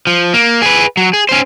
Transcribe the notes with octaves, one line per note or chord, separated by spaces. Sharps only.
F3
A#3
G#4 B4
F#3
G#4
C#4 C5